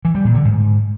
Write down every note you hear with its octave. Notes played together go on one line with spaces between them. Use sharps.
E3
G3
A#2
D3
G#2